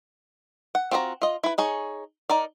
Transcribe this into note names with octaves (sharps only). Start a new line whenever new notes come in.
F#5
C4 F4 F#4 D#5 A#5
F4 D#5
E4 B4
D#4 G#4 C#5
D#4 A#4 D5